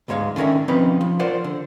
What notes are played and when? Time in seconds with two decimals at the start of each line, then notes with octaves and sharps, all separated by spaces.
0.08 D2 G#2 G#3 C#5 F5
0.36 D3 D#3 C#4 A#4 E5
0.68 F3 C4 C#4 D#4 B4
1.01 F3
1.19 F4 A#4 C5 D5 F#5
1.44 D3